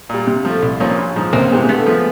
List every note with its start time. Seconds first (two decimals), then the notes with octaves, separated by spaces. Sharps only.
0.09 A#2 G3
0.27 C3
0.45 F3 A3
0.62 C2
0.80 A#2 F3 A#3 C#4
0.98 A#1
1.16 G#2 F3
1.33 C#2 A#3 C4
1.51 C3 E3 G#3 B3
1.69 D3 A3 B3
1.86 F3 G#3